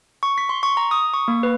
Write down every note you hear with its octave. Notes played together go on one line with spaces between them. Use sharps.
C#6
B6
C6
C#6
A#5
D#6
C#6
A#3
B4